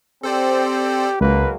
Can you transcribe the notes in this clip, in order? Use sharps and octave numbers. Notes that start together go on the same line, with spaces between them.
C4 G4 A4 C5 D5
C#2 F#3 G#3 A#3 B4